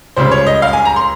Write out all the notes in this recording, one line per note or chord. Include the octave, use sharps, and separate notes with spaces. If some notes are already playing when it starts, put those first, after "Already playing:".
C#2 C#3 G3 C5
C#5
D#5
F5
G#5
A#5
C6